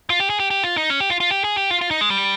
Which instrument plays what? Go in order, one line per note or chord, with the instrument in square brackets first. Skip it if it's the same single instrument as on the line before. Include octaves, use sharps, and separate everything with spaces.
[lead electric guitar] F4
G4
G#4
G4
G4
F4
D#4
C#4
G4
F4
F4
G4
G#4
G4
F4
F4
D#4
G#3
G3